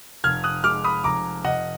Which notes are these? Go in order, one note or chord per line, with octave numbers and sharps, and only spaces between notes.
F1 F6 G#6
D#6 F#6
G#3 D6 F6
B5 D#6
F1 A#5 D6
F1 D#5 F#5